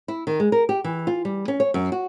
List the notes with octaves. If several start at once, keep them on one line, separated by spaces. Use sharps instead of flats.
E4
D#3
G#3
A#4
G4
E3
F4
G3
C#4
C#5
F#2
F#4